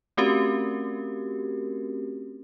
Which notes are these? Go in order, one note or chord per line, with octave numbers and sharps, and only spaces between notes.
A3 C4 C#4 F#4 G4 A#4